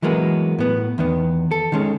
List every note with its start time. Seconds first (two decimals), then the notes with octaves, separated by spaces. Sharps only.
0.02 E3 F#3 G#3 A#3 B3
0.59 A2 B3
0.98 E2 D#3 B3
1.51 A4
1.72 D#3 G#3 C#4